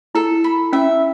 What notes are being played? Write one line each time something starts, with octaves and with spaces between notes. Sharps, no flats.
E4 A4
B5
C#4 E5